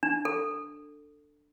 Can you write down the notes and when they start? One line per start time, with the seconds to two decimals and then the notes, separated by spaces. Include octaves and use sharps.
0.03 D4
0.25 A4